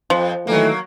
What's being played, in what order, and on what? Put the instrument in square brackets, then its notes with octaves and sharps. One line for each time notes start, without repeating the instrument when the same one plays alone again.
[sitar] F2 [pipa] F3
[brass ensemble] D#3 E3 A3 [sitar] F#3 A#3